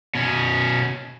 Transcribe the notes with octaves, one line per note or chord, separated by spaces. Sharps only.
B2 C#4